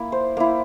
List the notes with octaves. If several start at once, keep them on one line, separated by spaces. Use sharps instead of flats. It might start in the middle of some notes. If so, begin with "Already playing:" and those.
Already playing: A#3 E4
C5
A#3 E4